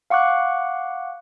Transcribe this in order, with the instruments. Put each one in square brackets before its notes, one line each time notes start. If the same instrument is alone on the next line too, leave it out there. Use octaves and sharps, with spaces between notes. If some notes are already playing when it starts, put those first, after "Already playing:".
[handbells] F5 F#5 C#6 D6 F#6